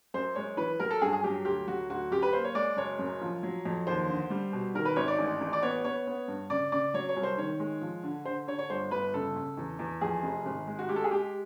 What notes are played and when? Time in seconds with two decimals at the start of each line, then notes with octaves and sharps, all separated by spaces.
0.14 F#2 C5
0.35 G#3 C#5
0.57 E3 B4
0.80 F#3 A#4
0.91 A4
1.02 G2 G#4
1.13 G#4
1.24 F#3 G4
1.45 D2 G4
1.68 F#3 F#4
1.90 D2 F#4
2.11 F#2 G4
2.22 B4
2.33 A#3 C5
2.44 C#5
2.55 G#3 D5
2.77 F#1 C#5
2.99 F#2
3.21 F3
3.43 F#3
3.65 F2
3.87 D#2 C5
4.09 D3
4.30 G3
4.53 B2
4.74 D#3 A#4
4.85 B4
4.96 G#1 C#5
5.08 D5
5.19 A1
5.41 A1
5.53 D5
5.63 B3 C#5
5.84 B3 C#5
6.07 B3
6.28 G2
6.50 C#3 D5
6.72 C#3 D5
6.94 F#3 C#5
7.09 C#5
7.17 C2
7.23 C5
7.38 D#3 C#5
7.60 G#3
7.81 F3
8.03 D3
8.25 D3 C5
8.47 D3 C#5
8.59 C#5
8.70 G1 C5
8.91 G1 B4
9.14 C#3 A4
9.36 C#3
9.57 E2
9.79 E2
10.01 F2 G#4
10.23 F1
10.46 G#1
10.67 G#3
10.79 F#4
10.89 G#3 G4
10.96 A4
11.04 G#4
11.11 G#3 G4